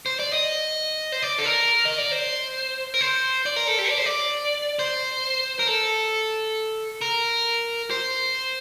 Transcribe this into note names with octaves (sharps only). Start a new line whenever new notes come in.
C5
D5
D#5
C5
D5
A4
A#4
D#5
D5
C5
A#4
C5
D5
A#4
A4
G4
D5
C5
D5
C5
A#4
A4
A#4
C5